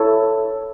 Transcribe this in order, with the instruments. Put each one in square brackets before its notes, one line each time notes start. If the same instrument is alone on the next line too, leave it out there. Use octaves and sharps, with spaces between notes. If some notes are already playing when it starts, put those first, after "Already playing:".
Already playing: [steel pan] E4 A4 C#5